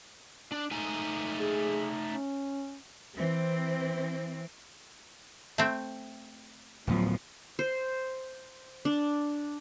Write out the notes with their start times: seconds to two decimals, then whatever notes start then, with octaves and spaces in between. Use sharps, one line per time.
0.52 D4
0.71 A3 D#4 G#5
1.40 G#4
2.09 C#4
3.16 E3 C4
5.58 A3 C4
6.87 D1 A2 F3 F#3 B3
7.59 C5
8.85 D4